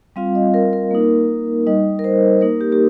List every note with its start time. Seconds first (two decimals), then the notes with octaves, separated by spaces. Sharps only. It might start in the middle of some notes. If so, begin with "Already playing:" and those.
0.16 G3 C4 F4 F5
0.35 D#5
0.54 A#4
0.73 A#4
0.91 A#3 D#4
1.67 G3 D#4 D#5
1.99 A#4
2.04 C5
2.41 A#3 D#4 A#4
2.61 G4
2.72 G4